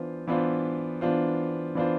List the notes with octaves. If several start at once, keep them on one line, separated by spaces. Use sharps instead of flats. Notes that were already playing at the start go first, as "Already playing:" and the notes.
Already playing: E3 B3 D4 F4 C5
E3 B3 D4 F4 C5
E3 B3 D4 F4 C5
E3 B3 D4 F4 C5